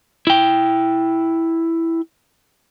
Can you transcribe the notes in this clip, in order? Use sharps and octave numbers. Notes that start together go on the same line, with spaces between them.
E4 G5